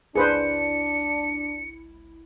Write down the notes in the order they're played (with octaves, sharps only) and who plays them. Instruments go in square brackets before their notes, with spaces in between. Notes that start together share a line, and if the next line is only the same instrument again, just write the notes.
[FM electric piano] G1 C#2 E4 [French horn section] D4 [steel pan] G#4 B4 C5 [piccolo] C#7